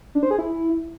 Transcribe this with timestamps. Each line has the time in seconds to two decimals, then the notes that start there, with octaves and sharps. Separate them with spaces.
0.15 D4
0.23 C5
0.31 G#4
0.39 E4